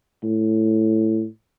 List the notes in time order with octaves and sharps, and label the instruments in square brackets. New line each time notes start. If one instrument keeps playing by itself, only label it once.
[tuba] A2